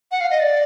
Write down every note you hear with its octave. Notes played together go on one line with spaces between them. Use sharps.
F#5
F5
D#5
D5